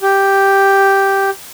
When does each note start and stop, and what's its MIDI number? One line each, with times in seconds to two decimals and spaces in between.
0.02 1.30 67